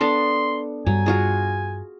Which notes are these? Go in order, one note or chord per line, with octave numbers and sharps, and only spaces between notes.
B3 D4 A4 C6
G2 F#3 G3 G#5
F4 F#4 G#4